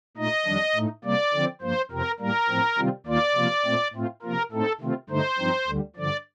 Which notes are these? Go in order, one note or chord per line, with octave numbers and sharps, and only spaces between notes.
A#2 A3 D#4 D#5
F2 D#3 G3 D4
A2 A3 D#4
C3 G3 A#3 D5
D3 F3 C4
G2 F3 A#3 C5
F2 C3 F3 C4 A#4
A2 G3 A#3 A#4
A2 F3 C4
C3 D#3 G3 C4 F4
D#2 D#3 A#3 F4 D5
C3 F3 A#3 F4
A#2 A3 C4
A2 A3 C4 F4
C3 F3 A#3 F4 A#4
A2 A3 C4 D#4 A4
C3 D#3 A3 C4 F4
G2 D3 A3 D#4 C5
G2 F3 C4 D#4
D2 D3 G3
G2 D3 F3 D5